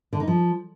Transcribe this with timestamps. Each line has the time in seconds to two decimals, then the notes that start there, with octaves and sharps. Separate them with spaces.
0.13 D3
0.20 D#4
0.27 F3